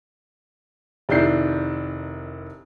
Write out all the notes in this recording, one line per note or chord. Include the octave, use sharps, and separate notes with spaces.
F1 D#3 D4 E4 G6 C7